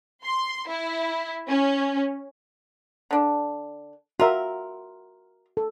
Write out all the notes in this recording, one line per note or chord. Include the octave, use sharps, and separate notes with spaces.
C6
E4
C#4
D3 D4
F4 F#4 A#4 E5
A4